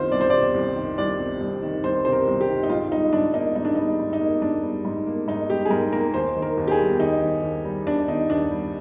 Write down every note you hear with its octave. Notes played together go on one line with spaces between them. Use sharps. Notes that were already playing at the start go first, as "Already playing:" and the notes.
Already playing: C2 C3 D#3 F4 C5
C2 D5
C5
C3 D5
C2
D#3
C2 D5
C3
C2
D#3
C2 C5
C3 C5
A#4
C2
G4
D#3
D#4
G#2 F4
G3 D#4
G#2 D4
A#3 D#4
G#2 D#4
D4
D#4
G3
G#2
D#4
A#3
G#2 D4
G3
G#2
A#3
G#2 D#4
G3 G4
G#4
G#2 A#4
A#3 A#4
D#2 C5
D#3
A#4
D#2
G4
G#4
G3
D#2 D#4
D#3
D#2
G3
D#2 D4
D#3 D#4
D#2 D4
G3